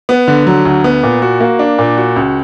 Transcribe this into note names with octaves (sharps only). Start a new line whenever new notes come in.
B3
D3
F#3
D2
B3
A#2
F#4
A#3
D4
A#2
F#4
C#2